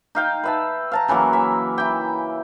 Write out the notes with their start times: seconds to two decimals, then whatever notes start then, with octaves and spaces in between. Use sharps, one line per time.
0.15 D#4 F5 G5
0.44 B4 E5 A5
0.92 F5 A5 A#5
1.08 C#3 E3 F#3 A#3
1.33 E5
1.78 E4 G5